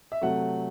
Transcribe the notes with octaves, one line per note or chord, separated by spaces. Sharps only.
E5
C3 F#3 A3 F#5